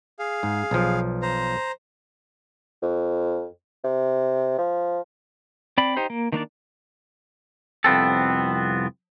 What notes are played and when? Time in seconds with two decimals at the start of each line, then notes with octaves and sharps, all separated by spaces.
0.19 G#4 F5
0.43 G#2
0.71 B1 F3
1.22 C5 A#5
2.82 F2
3.84 C3
4.58 F3
5.78 C4 D5 B5
5.97 D#4 G4 C5
6.10 A#3
6.32 D#3 A#3 D4 D5
7.84 C2 F2 B3 C4 A4